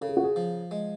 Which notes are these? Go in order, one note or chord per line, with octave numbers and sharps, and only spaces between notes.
C#3 A4
G#4
F#4
G#4
F3
G#3